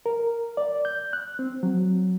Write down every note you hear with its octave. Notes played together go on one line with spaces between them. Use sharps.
A#4
D5
G6
F#6
C4
F#3